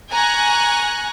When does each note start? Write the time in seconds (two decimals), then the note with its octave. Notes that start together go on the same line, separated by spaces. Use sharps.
0.12 G#5 A#5 C#6 F#6